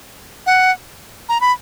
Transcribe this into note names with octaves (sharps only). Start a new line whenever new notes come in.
F#5
A#5
B5